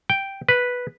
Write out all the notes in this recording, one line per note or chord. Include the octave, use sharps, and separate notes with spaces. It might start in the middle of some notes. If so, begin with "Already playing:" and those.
G5
B4